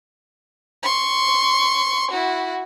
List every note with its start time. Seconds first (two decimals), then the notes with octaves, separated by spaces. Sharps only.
0.83 C6 C#6
2.11 E4 F#4